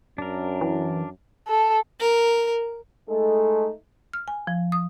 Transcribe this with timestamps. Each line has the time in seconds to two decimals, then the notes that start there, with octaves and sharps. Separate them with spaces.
0.18 F#2 D4 A#4
0.61 E3
1.48 A4
2.00 A#4
3.09 G#3 A3 D#4 A4
4.13 F6
4.28 G#5
4.47 F3
4.72 D#6